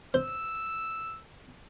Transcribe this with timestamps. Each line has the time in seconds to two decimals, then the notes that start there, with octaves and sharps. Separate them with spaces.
0.14 C5 E6